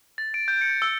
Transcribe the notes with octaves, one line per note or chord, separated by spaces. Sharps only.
A6
D7
G6
C#7
E6